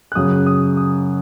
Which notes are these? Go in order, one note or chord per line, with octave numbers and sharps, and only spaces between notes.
F#6
F#2 C#3 D#6
D#6
D#6